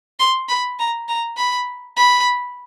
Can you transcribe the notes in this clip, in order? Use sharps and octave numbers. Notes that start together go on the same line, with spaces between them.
C6
B5
A#5
A#5
B5
B5